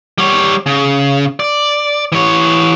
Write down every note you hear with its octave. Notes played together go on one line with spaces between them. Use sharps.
G3 C#5
C#3
D5
E3 C#5